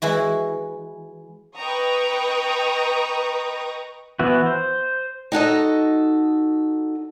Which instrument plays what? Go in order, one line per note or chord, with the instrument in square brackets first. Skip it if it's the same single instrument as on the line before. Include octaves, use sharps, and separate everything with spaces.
[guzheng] E3 G#3 E4 F#4
[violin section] B4 D#5 G5 A#5 C#6 D#6
[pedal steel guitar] E3 B3 E4 F#4
C5
[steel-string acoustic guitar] D#4 F#4 A4 D#5